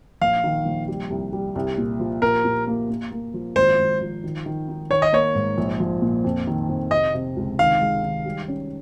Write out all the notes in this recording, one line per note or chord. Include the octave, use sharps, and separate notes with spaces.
A#1 F5
D#3
A#1
G3
C2
G3
C2
A#2
F3
A#2 A#4
A#2
A#3
A#3
A#3
F3
G#1 C5
G#1
F3
D#3
D#3
D#4
D#3 C#5
D#5
A#3 C#5
G#2
A#1
F3
A#2
F2
D#3
F2
C3 D#5
C3
C#2
D#3 F5
G#3
D#3
G3
C#4